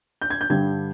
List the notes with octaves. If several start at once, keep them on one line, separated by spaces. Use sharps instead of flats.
G6
G#6
G6
G2 D3 G3 G#6